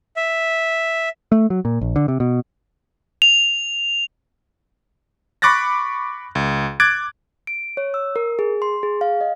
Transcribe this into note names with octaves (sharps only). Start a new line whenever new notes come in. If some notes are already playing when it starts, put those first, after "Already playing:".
E5
A3
F#3
A#2
A#1
D3
C3
B2
F7
B5 C#6 D6 F#6 A6 A#6
C#2
D6 F#6 G#6 A6 D7
D7
C#5
E6
A#4
G#4
C6
G#4
F5
D#5